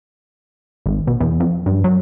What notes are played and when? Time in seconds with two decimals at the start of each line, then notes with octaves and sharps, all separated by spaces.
0.86 G#1
1.07 B2
1.20 E2
1.40 F2
1.66 G2
1.84 F#3